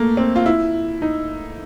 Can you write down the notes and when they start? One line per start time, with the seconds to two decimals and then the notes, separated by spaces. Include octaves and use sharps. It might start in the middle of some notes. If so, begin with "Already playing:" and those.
Already playing: A3 A#3
0.17 C4
0.36 F4
0.46 E4
1.02 D#4